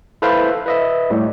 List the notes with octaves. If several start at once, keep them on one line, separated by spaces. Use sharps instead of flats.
E4 A4 B4 C5 E5 F5
B4 D#5 E5
A2 G3